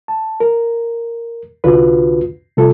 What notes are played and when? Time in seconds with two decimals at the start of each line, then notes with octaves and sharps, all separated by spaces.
0.08 A5
0.40 A#4
1.64 C2 D3 D4 F4 F#4 B4
2.57 C3 G3 F4 A4